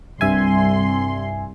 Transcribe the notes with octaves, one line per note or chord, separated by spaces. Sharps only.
C2 G2 E5 G#5 C6